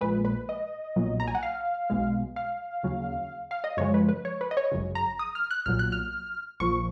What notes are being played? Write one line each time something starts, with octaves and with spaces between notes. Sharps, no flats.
A#1 A#2 G#3 B4
B4
D#5
B1 A#2 F#3
A#5
G#5
F#5
F5
B1 B2 G#3
F5
D#2 C#3 F#3
F5
D#5
F#2 C#3 F3 G#3 C#5
B4
B4
C#5
B4
D#5
C#5
G#1 F#2 C#3
A#5
D#6
F6
F#6
B1 A#2 F#3 F6
F#6
F6
A#1 A#2 F3 C#6